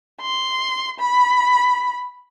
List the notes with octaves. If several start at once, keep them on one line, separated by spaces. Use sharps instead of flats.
C6
B5